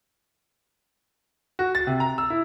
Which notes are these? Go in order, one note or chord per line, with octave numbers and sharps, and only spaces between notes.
F#4
A6
C3
A#5
E6
E4